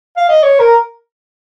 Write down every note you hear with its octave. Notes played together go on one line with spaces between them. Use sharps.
F5
D#5
C#5
A#4